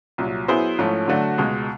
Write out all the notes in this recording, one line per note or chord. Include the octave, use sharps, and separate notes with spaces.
C2 A#2 F#3
F#3 B3 E4 G#4 C5
G#2 F3 A3 C#4 E4
D3 F#3 A3 D4 F#4
C#2 B2 G#3